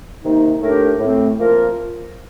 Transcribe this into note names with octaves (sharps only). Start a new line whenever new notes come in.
C3 D#3 A#3 D#4
A2 A3 D4 G4 A#4
A2 A3 C4
F3 A#3 F4 A#4